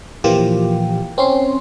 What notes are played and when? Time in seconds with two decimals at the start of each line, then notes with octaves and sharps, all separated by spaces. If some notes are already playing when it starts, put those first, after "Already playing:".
0.24 A#2 E3 F3 A#3 F4 G4
1.18 C4 C#4 C6